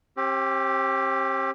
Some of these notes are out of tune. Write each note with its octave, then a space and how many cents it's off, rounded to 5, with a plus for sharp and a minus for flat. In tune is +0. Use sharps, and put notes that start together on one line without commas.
C4 +45 G4 +0